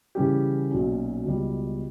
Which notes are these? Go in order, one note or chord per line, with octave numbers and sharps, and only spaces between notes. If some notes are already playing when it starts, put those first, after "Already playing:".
C#3 E3 G3 C#4 G4
B1 A#2 F#3 C#4
C#2 B2 G3